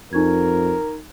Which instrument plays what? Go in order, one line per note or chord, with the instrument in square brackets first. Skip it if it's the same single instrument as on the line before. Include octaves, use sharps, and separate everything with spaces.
[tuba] F2 [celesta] D#4 C#6 G#6 [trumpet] A#4